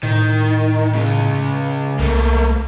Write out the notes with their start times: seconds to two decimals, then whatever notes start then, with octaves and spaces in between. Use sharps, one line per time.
0.03 A2 D#3
0.95 C#3 G#3
1.99 C2 A3 A#3